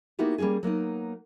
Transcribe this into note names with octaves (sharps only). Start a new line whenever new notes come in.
A#3 B3 D#4 E4 F#4 G4
G3 A#3 C4 C#4 G#4
F#3 A#3 B3 D#4